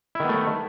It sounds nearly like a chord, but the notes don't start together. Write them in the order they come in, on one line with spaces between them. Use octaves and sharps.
E4 D#3 B3 A3